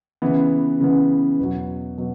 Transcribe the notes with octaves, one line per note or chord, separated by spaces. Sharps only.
C#3 E3 B3
C#3 E3 B3
E2 B2 F#3
B2 F#3